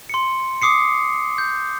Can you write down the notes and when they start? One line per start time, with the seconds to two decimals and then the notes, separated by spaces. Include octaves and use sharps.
0.09 C6 C#7
0.62 D6 D#6 C7 C#7
1.38 G6